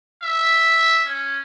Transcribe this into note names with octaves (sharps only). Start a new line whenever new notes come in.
E5
C#4